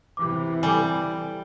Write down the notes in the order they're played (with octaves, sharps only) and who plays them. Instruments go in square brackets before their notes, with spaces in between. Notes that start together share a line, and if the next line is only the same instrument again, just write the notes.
[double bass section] C3 E3 [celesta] D6
[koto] G3 [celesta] A4 G#5